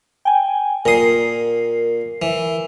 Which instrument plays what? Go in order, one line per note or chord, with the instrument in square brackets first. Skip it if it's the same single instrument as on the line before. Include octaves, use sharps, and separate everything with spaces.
[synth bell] G5 G#5
[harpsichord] A#2 D#6 [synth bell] A#4 C7
[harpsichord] E3